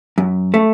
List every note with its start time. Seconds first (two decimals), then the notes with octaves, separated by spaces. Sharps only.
0.18 F#2
0.54 A3